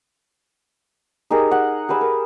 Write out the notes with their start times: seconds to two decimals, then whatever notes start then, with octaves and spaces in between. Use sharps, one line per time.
1.30 D#4 G4 G#4 A#4
1.51 F#5
1.89 G4 G#4 B4 E6
2.01 A#4